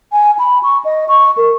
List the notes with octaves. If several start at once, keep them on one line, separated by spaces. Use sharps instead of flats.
G#5
B5
C#6
D#5
C#6
A#4